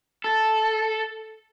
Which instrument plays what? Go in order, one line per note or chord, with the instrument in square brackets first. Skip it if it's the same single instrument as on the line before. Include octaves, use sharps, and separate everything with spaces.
[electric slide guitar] A4